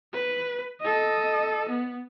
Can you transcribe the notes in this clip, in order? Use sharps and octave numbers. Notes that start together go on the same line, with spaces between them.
B4
A4 D#5
B3